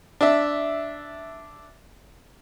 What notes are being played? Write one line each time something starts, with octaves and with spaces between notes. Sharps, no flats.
D4 E5